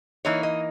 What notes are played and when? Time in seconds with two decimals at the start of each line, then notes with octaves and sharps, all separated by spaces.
0.25 E3 A#3 D#4 C#5
0.43 D#5